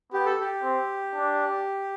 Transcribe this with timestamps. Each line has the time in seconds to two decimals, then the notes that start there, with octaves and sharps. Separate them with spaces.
0.13 B3 G4
0.26 A4
0.40 G4
0.64 C4
1.14 D4